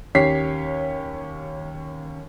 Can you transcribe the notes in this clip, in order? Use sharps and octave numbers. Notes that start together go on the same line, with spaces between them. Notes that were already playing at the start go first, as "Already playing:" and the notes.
D#2 C#4 G4 C#5 B6 C7